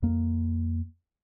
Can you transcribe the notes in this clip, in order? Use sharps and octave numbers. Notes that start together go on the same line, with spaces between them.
F2 A#3